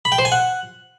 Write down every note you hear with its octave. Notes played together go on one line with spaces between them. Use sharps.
B5
G5
C5
G#5
F#5